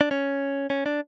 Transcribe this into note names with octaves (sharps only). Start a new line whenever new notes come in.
D4
C#4
C#4
D4